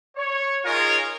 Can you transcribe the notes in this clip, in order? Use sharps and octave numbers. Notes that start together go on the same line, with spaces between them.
C#5
D#4 F4 G#4 A#4 C#5